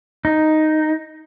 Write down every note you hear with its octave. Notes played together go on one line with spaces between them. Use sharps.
D#4